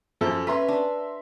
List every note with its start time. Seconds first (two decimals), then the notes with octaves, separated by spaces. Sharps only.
0.21 F#2 F3 A4
0.47 C#4 B4 E5 A#5 C6
0.68 D4